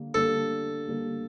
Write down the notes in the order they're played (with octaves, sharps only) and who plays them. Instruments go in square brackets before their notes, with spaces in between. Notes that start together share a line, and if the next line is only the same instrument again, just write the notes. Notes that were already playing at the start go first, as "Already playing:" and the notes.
Already playing: [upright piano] D3 G3 A#3 D4
[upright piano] D3 G3 A#3 D4 G4 [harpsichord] A4
[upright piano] D3 G3 A#3 D4 G4